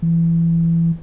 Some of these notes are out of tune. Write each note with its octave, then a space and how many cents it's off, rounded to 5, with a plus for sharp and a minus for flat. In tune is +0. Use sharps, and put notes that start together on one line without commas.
E3 +20